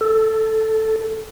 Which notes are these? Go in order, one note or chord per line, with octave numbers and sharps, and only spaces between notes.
A4